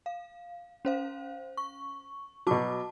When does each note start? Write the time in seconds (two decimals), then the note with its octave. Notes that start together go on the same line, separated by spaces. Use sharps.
0.06 F5
0.85 C#4 C5 F5
1.57 C#6
2.47 B2 F#3 F#4 A5 D6